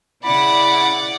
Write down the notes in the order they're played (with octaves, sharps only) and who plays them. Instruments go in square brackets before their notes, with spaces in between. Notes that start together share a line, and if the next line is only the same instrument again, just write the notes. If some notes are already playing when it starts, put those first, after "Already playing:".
[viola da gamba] C#3 E4 [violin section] D5 F#5 [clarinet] B5